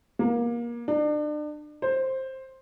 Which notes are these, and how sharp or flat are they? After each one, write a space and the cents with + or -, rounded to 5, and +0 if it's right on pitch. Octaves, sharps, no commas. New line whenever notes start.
A#3 +25
D4 +35
C5 +10